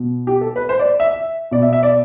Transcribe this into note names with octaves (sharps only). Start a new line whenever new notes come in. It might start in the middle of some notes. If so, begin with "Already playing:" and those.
Already playing: B2
G4
A4
B4
C5
D5
E5
E5
B2 D5
E5
E5
D5